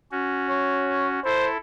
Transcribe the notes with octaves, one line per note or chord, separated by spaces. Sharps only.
C#4 F#4
C#5
E4 A4 C5